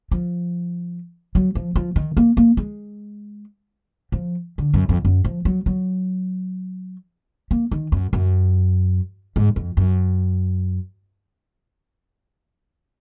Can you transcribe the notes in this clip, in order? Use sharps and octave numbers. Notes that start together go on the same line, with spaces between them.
F3
F#3
F3
F3
D#3
A#3
A#3
G#3
F3
D3
F#2
F2
F#2
F3
F#3
F#3
A#3
D#3
F#2
F#2
G#2
F2
F#2